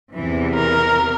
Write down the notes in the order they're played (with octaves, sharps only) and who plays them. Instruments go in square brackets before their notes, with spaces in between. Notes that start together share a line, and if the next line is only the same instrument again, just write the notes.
[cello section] E2 C3 E3
[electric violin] A#4